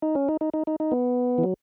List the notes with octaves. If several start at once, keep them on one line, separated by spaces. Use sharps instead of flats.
D#4
C#4
D#4
D#4
D#4
D#4
D#4
B3
E3
F#3